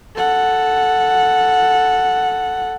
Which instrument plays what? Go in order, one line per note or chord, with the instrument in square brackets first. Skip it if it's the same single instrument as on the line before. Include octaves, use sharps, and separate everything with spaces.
[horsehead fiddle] A4 F#5